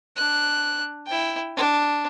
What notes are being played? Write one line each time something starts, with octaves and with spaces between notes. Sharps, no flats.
D4 F#6
E4 G5
D4